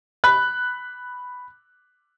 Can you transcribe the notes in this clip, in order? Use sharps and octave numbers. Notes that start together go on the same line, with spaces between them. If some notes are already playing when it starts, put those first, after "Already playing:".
B5 F#6